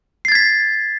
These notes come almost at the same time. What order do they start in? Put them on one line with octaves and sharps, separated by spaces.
C7 A6 G#6 B6